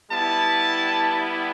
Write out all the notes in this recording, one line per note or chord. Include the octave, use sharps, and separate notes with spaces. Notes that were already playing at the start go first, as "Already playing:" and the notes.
G3 B3 E4 A5